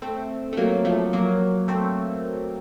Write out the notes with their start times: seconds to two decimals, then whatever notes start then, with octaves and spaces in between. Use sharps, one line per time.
0.02 A3 C4
0.53 A3
0.57 F#3 A#3
0.85 F3 A3
1.13 F#3 A#3
1.68 A3 C4